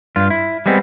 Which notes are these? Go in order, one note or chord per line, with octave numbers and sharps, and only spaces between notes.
G2 F4
E4
G3 G#3 B3 C4